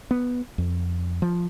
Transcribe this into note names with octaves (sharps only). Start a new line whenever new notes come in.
B3
F2
F3